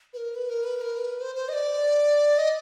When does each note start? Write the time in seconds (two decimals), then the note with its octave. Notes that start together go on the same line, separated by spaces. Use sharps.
0.13 B4
0.17 A#4
0.35 B4
0.49 A#4
0.64 B4
0.77 B4
0.81 A#4
0.98 B4
1.21 C5
1.35 C5
1.48 D#5
1.53 D5
2.38 D#5